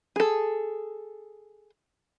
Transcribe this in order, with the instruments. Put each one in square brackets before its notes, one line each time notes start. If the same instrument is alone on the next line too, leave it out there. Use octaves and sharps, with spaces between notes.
[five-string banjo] G#4 A4